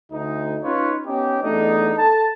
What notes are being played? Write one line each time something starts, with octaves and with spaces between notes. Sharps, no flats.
D2 D#4
C#4 D#4 F4 B4 C#5
B3 C#4 D#4 G4
E2 A3 D4 D#4
A4 A5